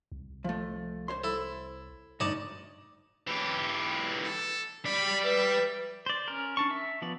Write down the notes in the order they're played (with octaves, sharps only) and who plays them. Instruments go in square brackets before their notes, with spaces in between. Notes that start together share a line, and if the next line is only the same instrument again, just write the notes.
[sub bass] C2
[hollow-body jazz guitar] F3 A3
C5 C#5 C6
[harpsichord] E4 A4
[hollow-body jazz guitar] D2 C#5 [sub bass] G2 [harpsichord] D#4 D5 A5
[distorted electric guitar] E3 G4
[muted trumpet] A4
[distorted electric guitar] G3 D5 [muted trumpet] B5
[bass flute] B4 [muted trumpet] E5
[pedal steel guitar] C5 D5
C#4 A#4
D4 A5 C#6
E5
F3 B3 D5